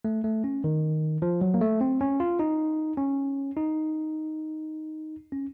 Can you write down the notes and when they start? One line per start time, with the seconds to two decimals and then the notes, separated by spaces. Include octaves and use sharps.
0.05 A3
0.24 A3
0.44 C#4
0.64 D#3
1.22 F3
1.41 F#3
1.54 A#3
1.61 A3
1.81 C4
2.01 C#4
2.20 F4
2.39 D#4
2.97 C#4
3.57 D#4
5.32 C#4